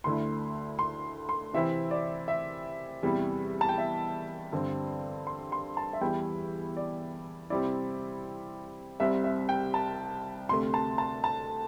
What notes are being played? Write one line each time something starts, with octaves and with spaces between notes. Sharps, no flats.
D2 D3 A3 E4 C6
C6
C6
C3 E3 C4 E4 E5
D5
E5
E2 C3 G3 E4
A5
G5
E5
G2 D3 C4
C6
C6
A5
E5
E2 E3 G3 E4 G5
D5
C3 G3 C4 E4 D5
C2 C3 G3 C4 E5
E5
G5
A5
D2 C3 A3 C6
A5
A5
A5